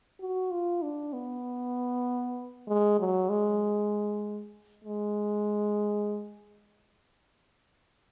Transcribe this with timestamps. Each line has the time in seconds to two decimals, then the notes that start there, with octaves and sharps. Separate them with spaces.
0.20 F#4
0.51 F4
0.82 D4
1.13 B3
2.67 G#3
2.99 F#3
3.29 G#3
4.84 G#3